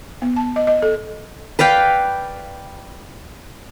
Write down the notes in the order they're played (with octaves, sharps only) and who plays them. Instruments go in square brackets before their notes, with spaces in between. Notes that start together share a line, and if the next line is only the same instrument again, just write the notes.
[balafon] B3
A5
D#5
D#5
A4
[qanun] B4 D5 F5 G5